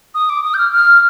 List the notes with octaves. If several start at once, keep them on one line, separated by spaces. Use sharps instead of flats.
D#6
D6
D#6
G6
F6
F6